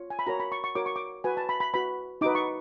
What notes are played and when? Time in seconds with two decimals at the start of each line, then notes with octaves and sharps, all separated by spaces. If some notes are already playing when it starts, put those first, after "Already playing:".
Already playing: F4 C#5
0.10 G#5
0.19 B5
0.27 F#4 A#4 C#5 A#5
0.40 B5
0.52 C#6
0.64 C#6
0.75 F#4 A#4 C#5 D6
0.86 C#6
0.96 D6
1.24 F#4 B4 G#5
1.37 A5
1.49 B5
1.60 B5
1.74 F#4 B4 B5
2.21 D#4 F#4 B4 D6
2.35 C#6